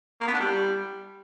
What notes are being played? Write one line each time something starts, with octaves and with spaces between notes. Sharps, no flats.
A#3
B3
D4
G3